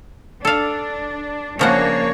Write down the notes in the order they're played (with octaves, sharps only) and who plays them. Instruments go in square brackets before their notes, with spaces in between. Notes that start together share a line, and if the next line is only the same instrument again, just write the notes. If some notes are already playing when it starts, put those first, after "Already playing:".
[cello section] D4 [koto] A4 F5
[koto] C#3 F3 F#5 [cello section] A#3 D4 C#5